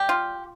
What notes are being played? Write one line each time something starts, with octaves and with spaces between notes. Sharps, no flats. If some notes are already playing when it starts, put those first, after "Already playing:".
Already playing: G3 G4
F4